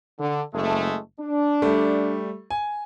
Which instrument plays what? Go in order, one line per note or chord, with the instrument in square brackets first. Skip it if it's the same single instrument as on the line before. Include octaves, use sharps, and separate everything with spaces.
[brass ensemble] D3
F#1 G#3 A3
D4
[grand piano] G3 A3
G#5